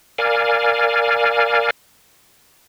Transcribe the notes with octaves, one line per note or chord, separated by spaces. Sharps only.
A#4 D5 F5 G#5